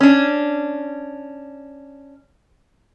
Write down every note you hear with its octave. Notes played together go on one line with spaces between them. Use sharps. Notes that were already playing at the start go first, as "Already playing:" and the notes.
C#4 D4